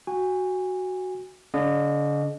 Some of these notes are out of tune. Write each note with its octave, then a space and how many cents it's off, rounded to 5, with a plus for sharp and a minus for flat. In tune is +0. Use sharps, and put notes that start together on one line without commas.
F#4 +0 G#5 -25
D3 -45 D#5 -30